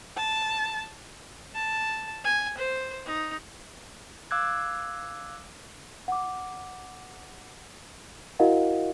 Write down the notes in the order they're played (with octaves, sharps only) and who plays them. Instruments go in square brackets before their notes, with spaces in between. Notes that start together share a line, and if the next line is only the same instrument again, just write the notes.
[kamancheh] A5
[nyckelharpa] A5
G#5
C5
D#4
[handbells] F5 D6 E6 F#6 G#6
[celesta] F#5 D6
E4 F#4 A#4 D#5 F5 F#5